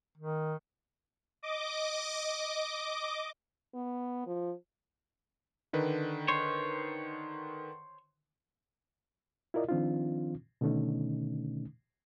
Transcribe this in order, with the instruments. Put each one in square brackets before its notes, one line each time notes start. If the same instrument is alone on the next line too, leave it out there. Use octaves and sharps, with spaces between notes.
[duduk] D#3
[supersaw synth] D#5 D6
[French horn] B3
F3
[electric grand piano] D3 D#3 B4
[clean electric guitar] C5 C#5
[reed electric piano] E4 F4 A#4 D5 D#5
D#3 F3 C4 D4 D#4 F4
B2 D3 D#3 A3 C#4 D#4